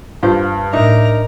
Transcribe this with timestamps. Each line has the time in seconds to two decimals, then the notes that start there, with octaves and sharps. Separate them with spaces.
0.23 G2 F4 C5
0.73 A2 D4 D#4 A#4 E5 A#5